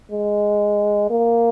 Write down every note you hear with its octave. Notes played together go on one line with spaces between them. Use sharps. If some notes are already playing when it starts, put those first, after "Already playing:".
G#3
A#3